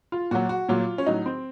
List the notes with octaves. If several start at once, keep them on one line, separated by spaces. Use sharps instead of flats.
F4
A#2 F#3 F#4
F#4
A#2 F#3 F4
C#4
A2 F#3 D#4
C4